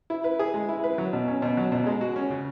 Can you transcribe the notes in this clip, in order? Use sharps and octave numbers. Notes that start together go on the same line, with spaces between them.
E4
B4
G#4
G#3
E4
B4
F#3
B2
C#4
B2
F#3
B2
G#3
F#4
C#4
C#3